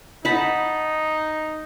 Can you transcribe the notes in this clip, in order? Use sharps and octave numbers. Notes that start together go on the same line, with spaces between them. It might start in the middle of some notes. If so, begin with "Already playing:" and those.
D#4 F#5 A5 B5